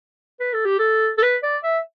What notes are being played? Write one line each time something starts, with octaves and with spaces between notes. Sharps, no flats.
B4
A4
G4
A4
A4
B4
D5
E5